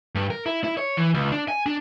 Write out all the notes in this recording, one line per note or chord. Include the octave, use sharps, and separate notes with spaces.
G2
A#4
E4
E4
C#5
E3
C#2
D4
G#5
D4